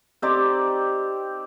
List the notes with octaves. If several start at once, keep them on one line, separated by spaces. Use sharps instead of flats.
C4 D#4 G4 D5